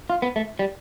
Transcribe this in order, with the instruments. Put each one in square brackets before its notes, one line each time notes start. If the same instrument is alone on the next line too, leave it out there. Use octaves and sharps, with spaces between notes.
[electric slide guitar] F4
B3
A3
G3